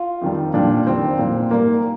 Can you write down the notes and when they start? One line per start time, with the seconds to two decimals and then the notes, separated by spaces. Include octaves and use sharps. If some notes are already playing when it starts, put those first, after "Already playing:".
Already playing: F4
0.21 F2 D#3 G3
0.54 A#2 G3 D4
0.86 F2 D#3 G3 C4
1.19 A#2 G3
1.51 G#2 G3 A#3